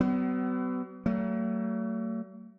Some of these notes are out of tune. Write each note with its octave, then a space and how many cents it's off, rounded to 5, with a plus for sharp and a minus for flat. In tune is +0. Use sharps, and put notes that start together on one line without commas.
F#3 +45 B3 +30
F#3 +45 A3 +40